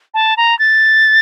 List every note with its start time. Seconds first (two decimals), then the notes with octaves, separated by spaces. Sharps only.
0.14 A5
0.37 A#5
0.59 A6